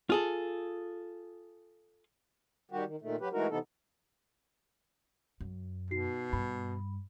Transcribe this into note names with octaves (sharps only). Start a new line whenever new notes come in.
F4 G#4 A4
D#3 G3 F#4 G4
D#3
A#2 D#3 A3
F#3 G4 B4
E3 G#3 A3 D#4 F#4 A#4
C3 E3 B3 D#4 A4
F#2
B2 D#4 F#4 C7
G2 B5